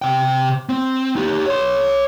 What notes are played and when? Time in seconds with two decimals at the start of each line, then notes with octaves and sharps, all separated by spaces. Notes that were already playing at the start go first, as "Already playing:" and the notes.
0.02 C3 G5
0.69 C4
1.16 D#4 G4
1.46 C#5 C6